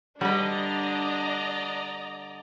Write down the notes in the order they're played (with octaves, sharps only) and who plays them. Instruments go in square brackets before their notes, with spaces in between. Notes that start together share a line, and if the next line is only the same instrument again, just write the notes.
[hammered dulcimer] D3 [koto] G3 B4 [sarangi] D4 [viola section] D5 D#5 A#5